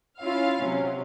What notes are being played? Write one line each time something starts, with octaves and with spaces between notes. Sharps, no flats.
C#4 E4 F4 F5
C3 F#3 C#4